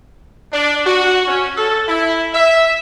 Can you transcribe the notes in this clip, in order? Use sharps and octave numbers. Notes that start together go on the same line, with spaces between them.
D4
F#4
C#4
A4
E4
E5